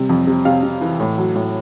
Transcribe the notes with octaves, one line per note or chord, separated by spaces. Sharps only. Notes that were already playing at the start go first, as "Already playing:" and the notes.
Already playing: C3 G3
F2
C3
C3 F5
C3
E3
A2
F#3
A2